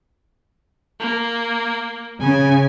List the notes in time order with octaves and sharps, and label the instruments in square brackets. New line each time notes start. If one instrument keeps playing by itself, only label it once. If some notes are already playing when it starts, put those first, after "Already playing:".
[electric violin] A#3
[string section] C#3 [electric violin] G#5